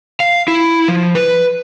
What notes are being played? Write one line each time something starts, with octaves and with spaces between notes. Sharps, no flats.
F5
E4
F3
B4